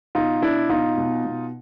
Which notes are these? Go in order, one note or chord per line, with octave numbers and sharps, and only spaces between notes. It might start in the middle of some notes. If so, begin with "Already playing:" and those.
B2 D#4 F4
B2 D4 E4
B2 D#4 F4
B2
B2